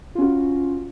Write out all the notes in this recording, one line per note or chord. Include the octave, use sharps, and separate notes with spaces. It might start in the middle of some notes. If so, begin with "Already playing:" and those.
C#4 F4 F#4